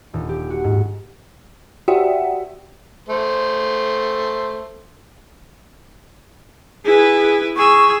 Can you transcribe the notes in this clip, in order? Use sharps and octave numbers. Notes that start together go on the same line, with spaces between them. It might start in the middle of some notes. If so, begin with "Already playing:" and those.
D#1
G4
F#4
G#2
F#4 G4 D5 E5 F#5 G5
A3 C5
E4 G#4 B4
G#4 C#6 E6